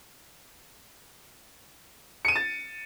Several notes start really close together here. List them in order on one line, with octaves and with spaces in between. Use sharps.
C#7 D#7 E7 A6